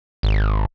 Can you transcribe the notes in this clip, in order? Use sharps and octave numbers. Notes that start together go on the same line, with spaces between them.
G#1